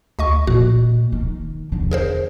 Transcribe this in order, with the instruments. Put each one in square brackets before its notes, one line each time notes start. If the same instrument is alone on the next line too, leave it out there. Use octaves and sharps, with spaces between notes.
[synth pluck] D2 D#5 C#6
[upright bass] A#2 [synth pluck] F#4
[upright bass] D#3
E2 D3
[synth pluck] G#4 A#4 C5